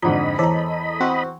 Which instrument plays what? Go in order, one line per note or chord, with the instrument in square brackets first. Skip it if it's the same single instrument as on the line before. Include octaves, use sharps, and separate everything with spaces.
[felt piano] F2 G#2 D3 [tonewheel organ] D#5 B5 [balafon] F#5 A#5
[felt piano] E2 A#5 [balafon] E3 C5 [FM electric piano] A4
[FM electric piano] C4 F#4